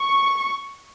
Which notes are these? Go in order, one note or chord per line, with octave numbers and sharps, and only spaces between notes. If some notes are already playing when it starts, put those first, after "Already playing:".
Already playing: C#6